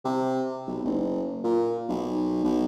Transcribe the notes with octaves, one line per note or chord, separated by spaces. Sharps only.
C3
B1
F#1
A#2
B1
B1